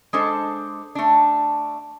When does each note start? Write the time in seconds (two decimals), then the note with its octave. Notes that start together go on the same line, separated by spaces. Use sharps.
0.13 G#3 D4 A4 C5
0.95 A3 D4